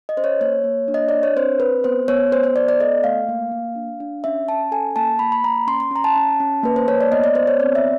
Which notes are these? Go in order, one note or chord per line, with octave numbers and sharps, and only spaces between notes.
D#5
C#4 C5
C#5
A#3 C#5
A#3
D4
D#5
D4 D5
C#5
C4 C5
C4 B4
B3 C5
B3 C#5
B3 C5
C5
B3 D5
D5
A4 D#5
A3 F5
A#3
A#3
D4
D4
C#4 E5
C#4 A5
A4 G#5
A#3 A5
A#3 B5
B5
A#3 A#5
C#4 C6
C6
C#4 A#5
A5
C#4
C#4
A#3 B4
C5
A#3 C#5
D5
B3 D#5
D5
B3 C5
C#5
C4 D5
E5